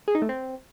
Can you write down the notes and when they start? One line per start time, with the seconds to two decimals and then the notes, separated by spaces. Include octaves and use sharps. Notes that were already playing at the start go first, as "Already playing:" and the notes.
0.08 G#4
0.15 D#4
0.22 A3
0.29 C4